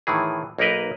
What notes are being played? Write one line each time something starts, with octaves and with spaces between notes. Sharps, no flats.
A2 D#3 E3 G#4
B1 A#3 D#4 A#4 B4 D#5